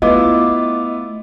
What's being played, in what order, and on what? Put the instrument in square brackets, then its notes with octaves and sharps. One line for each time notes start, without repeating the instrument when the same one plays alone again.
[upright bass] A3 [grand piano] B3 E4 F4 [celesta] D#5 D6